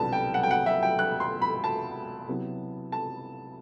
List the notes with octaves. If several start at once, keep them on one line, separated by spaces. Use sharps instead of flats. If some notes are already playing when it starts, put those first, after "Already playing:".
Already playing: C2 B2 G3 B3 D4 A5
G5
F#5
G5
F#5
E5
G5
F#6
C6
B5
A5
C3 F#3 B3 E4
A5